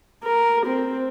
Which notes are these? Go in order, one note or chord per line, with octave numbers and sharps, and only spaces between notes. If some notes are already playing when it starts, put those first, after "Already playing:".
A#4
C4